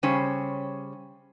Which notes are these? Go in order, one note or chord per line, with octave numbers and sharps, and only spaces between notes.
C#3 G3 C#4 C5